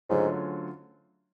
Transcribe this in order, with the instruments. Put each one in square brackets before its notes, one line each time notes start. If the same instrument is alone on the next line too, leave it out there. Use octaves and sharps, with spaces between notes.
[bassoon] G#2 [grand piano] D3 F#3 A3 C#4 F4